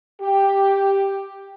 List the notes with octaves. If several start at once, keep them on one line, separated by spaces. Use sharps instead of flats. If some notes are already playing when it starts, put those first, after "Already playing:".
G4